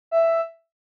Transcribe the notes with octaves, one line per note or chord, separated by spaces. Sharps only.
E5